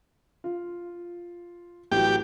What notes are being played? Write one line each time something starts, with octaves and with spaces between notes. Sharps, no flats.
F4
A1 F#3 G4